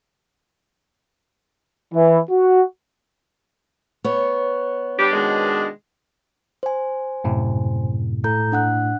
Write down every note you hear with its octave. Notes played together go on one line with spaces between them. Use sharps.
E3
F#4
B3 C#5
G3 D4 G4
B2 D#3 G#3
C5 G#5
F#2 A2 C3
A2 A4 A#5 G6
D4 F#5 F#6